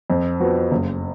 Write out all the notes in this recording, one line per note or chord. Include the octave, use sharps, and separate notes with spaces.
F2
F3 B3 F#4
F#1